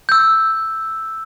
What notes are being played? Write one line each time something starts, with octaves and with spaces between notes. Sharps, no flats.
E6 G6